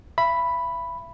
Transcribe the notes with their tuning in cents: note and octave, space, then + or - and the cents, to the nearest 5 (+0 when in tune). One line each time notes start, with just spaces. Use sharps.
E5 +35 B5 +0